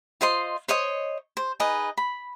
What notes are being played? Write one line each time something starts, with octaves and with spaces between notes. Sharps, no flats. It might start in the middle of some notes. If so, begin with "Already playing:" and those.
F4 C5 D#5 C6
C5 C#5 D#5 C#6
C5
D#4 G#4 B4 D#5
B5